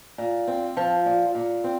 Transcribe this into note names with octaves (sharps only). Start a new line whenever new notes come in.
A#2
C4
F3
A#2
A#2
C4